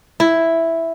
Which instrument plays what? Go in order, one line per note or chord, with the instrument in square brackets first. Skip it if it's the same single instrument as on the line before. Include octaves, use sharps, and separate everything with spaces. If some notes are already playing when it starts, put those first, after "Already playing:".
[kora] E4